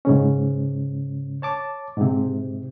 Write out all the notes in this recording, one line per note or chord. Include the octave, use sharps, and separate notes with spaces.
G#2 C#3 C#4
C#5 A5 D6
G#2 C3